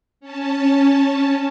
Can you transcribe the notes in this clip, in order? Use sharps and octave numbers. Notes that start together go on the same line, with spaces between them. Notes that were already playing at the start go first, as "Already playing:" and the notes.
C#4 A5